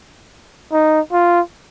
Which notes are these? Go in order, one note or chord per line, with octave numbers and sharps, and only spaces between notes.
D#4
F4